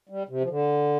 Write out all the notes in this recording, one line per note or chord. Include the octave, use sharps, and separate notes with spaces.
G3
C3
F3
D3